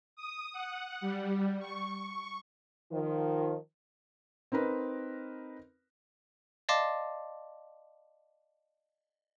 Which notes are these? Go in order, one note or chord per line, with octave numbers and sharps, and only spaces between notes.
D#6
F#5
G3
C#6
D#3 F3
C4 D#4 A#4 B4
D5 D#5 F5 A5 C6 D6